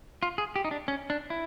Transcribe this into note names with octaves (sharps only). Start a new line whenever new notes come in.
F4
G#4
G4
D#4
D4
C#4
D4
E4